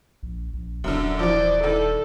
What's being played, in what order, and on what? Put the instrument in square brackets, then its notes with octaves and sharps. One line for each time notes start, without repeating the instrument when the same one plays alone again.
[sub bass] A#1
A#1
[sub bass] D#1 [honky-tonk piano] F#2 D3
[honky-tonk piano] E3 F3 [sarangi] D5
[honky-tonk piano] D#3 D#4 E4 [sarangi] A4